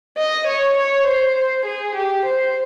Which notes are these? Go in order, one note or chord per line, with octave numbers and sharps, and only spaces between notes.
D#5
C#5
C#5
C5
G#4
G4
C5